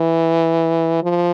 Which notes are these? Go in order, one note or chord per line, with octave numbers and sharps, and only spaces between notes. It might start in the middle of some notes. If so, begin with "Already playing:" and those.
Already playing: E3
F3